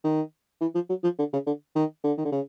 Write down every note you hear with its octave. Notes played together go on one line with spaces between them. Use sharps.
D#3
E3
F3
F#3
F3
D3
C#3
D3
D#3
D3
D#3
D3
C#3